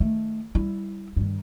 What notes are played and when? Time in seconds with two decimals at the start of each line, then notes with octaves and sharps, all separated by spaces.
0.01 D#3 A3
0.55 G3 E4
1.16 G2 D#3